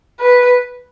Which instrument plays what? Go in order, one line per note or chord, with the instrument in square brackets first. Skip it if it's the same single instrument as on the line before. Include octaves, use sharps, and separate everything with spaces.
[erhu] B4